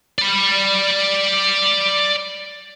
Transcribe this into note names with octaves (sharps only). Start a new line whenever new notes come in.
D5 B5